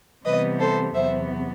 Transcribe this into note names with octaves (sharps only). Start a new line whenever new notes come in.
C3 E3 G3 B3 B4 D#5
A4 C5
E2 C3 F#3 B3 C5 E5